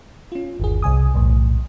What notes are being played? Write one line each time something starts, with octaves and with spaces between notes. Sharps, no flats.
C#4 F4
G1 D#2 G#4
C2 G#5 D#6
B1 E2 A2